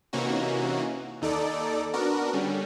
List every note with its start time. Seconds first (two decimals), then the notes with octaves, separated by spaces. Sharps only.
0.13 C3 E3 A#3 C#4 D#4 F#4
1.22 D#2 D#4 A4 D5
1.93 B3 D4 F#4 A#4
2.33 D3 G3 C#4